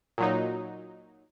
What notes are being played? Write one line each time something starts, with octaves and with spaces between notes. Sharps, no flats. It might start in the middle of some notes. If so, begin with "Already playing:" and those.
A#2 F#3 D#4